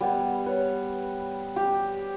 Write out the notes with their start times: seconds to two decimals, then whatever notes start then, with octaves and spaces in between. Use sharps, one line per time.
0.01 G3 B3 G#5
0.46 B4 C#5
1.56 G4